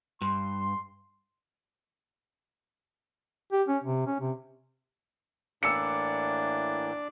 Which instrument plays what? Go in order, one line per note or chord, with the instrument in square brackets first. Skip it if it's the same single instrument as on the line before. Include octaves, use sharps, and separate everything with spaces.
[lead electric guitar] G2 [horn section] C6
[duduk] G4
C#4
C3
C#4
C3
[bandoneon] A2 E3 A#3 [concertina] D4 D5 [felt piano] E6 C#7